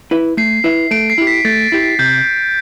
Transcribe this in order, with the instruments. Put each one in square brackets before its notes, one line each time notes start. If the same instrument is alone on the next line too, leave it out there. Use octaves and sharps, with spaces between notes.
[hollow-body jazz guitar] E4 B4 E5
[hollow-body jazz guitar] A3 [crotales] C7
[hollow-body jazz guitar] E4 B4 E5
[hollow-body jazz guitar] A3 [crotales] D7
[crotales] C7
[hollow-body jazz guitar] E4 G4
[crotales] B6
[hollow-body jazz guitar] A3 [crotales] A6
[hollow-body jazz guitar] E4 G4
[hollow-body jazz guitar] C3 [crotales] G6